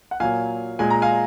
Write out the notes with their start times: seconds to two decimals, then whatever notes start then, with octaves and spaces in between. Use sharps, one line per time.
0.11 F#5
0.20 A#2 F#3 A#3 F5 G#5
0.79 A#2 G#3 G#5
0.90 A#5
1.02 F5 G#5